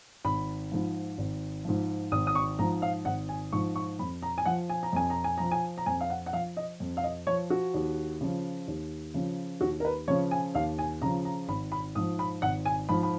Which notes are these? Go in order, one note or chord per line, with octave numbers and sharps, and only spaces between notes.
G#1 B5
G#2 F3
G#1
G#2 F3
G#1 D#6
D#6
C#6
G#2 F3 A#5
F5
G#1 F#5
G#5
G#2 F3 C#6
C#6
F2 B5
A#5
G#5
F3 F#5
G#5
A#5
F2 G#5
A#5
G#5
F3 A#5
G#5
A#5
F2 G#5
F5
F#5
F#5
F3 F5
D#5
F2
F5
D#5
F3 C#5
F#4
D#2
C#3 F3
D#2
C#3 F3
D#2 F#4
A#4
B4
C#3 F3 C#5
G#5
D#2 F5
G#5
C#3 F3 A#5
A#5
G#1 B5
B5
G#2 F3 D#6
B5
G#1 F#5
G#5
G#2 F3 B5
B5